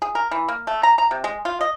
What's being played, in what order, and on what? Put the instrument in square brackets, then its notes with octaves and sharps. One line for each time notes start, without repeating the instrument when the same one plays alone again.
[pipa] G#4
A#4
E3
A#3
A3
A#5
A#5
C3
G#3
F4
D#5